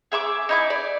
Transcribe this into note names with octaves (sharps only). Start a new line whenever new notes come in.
G#4 E5 C6 D6
D#4 E4 D6
D5